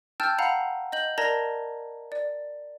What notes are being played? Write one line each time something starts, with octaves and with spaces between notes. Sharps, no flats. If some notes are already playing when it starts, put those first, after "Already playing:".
G5 A5 E6 F6 G6 A6
F5 F#5 A#5 B5
D#5 G6 F#7
A#4 D5 A5 A#5 G#6 A#6
D5